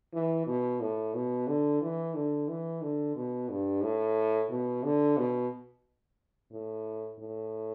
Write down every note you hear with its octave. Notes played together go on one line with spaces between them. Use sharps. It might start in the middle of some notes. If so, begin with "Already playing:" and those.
E3
B2
A2
B2
D3
E3
D3
E3
D3
B2
G2
A2
B2
D3
B2
A2
A2